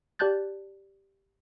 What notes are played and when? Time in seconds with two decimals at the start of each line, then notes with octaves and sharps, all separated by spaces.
0.19 G4 D5 A5 F#6 G6 A6